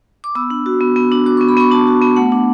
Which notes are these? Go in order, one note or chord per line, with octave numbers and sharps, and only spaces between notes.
D6
B3 E6
D4
F#4
B3
B3
D4
F#4 D6
B3 C#6
B5
B3 C#6
D4 A5
F#4
B3
A3 F#5
D4